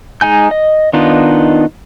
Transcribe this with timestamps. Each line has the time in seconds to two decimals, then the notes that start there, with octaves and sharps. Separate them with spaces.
0.21 G#3 D#4 G#5 G6
0.51 D#5
0.93 D#3 B3 D4 D#4 F4